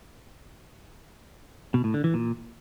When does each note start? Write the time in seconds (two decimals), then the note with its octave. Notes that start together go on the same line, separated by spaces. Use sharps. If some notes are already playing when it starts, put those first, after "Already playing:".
1.74 B2
1.84 A2
1.94 D3
2.04 E3
2.14 A#2